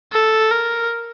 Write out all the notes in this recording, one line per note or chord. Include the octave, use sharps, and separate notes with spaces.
A4
A#4